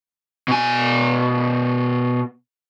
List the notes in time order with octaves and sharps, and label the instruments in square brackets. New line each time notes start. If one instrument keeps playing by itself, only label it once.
[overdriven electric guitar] B2 G#5